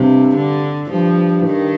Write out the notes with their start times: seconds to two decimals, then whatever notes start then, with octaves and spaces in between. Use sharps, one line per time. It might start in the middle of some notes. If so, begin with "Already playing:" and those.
Already playing: G2 C3
0.36 D3
0.91 G2 F3
1.46 D#3